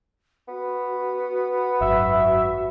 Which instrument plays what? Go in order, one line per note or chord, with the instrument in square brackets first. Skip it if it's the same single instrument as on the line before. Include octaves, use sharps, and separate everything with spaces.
[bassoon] B3 [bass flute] F#4
[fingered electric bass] G#1 F#2 [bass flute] F#4 [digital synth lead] E5